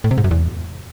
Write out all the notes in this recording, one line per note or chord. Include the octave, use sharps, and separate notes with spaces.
A2
C3
G#2
F#2
E2